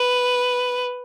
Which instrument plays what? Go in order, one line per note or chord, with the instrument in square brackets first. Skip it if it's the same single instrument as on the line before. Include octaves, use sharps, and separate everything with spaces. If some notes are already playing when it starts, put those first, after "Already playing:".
Already playing: [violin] B4